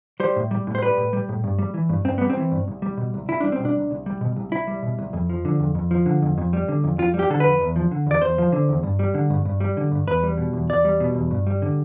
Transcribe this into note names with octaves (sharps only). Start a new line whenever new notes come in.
G3 C5
A2
G3
A2
C5
G3 B4
A2
G3
A2
G2
G3
E3
G2
G2 C4
G3 B3
C4
E3
G2
C2
G3
B2
C2
C2 E4
G3 D4
C4
B2
D4
C2
C2
G3
B2
C2
C2 E4
G3
B2
C2
F2
F3
D3
F2
F2
F3
D3
F2
F2
G3
D3
F2
F2 F4
G3
G4
D3 A4
F2 B4
E2
F3
D3
E2 D5
E2 C5
F3
D3
E2
G2
G3
D3
G2
G2
G3
D3
G2
E2 B4
G3
B2
E2
E2 D5
G3
B2
E2
G2
G3
D3